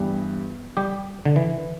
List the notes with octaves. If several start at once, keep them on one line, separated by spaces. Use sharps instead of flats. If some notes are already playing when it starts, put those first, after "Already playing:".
Already playing: G2 E3 G3 B3 G4
G3 G4
D3
E3